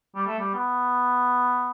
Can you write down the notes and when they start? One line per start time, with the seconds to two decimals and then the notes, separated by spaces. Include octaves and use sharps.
0.15 G3
0.27 A3
0.39 G3
0.55 B3